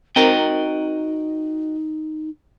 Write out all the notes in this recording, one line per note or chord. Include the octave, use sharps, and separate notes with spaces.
C4 D#4 F#4 A#4 D#5 G5